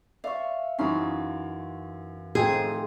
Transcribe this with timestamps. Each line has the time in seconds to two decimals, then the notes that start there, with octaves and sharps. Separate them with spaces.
0.24 D5 E5 F5 C#6
0.78 F#2 E3 C#4 D#4 E4 F5 C6
2.35 A2 D#3 F3 C4 D#4 G#4